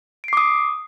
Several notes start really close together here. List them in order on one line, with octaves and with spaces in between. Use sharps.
D7 C7 D6 D#6